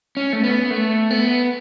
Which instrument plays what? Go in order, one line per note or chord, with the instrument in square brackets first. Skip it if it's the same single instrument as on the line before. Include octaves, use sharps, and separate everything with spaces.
[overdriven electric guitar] C#4
A3
B3
A3
B3